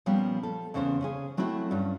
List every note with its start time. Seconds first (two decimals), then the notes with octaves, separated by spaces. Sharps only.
0.06 A#2 F3 G3 B3 C#4
0.43 A4
0.74 E2 C#3 B3 C#4 C5
1.01 C#3 C#4 G#4
1.37 F#3 A3 C4 E4 F#4
1.71 G2 C#4 F#4